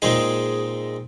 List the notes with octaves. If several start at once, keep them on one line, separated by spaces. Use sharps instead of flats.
A#2 G#3 C4 D#4 G#4